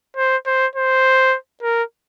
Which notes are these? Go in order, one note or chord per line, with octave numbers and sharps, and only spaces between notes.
C5
C5
C5
A#4